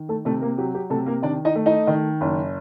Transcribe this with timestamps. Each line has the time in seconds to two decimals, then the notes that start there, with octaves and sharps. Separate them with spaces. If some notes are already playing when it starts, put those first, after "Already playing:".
Already playing: D#3
0.09 A3 A4
0.25 C3 A3 A4
0.41 A#3 A#4
0.58 F#3 G4
0.75 G4
0.90 C3 A3 A4
1.06 A#3 A#4
1.22 D#3 D4 D5
1.45 D#4 D#5
1.55 A3
1.66 D#4 D#5
1.87 D#3
2.21 F#1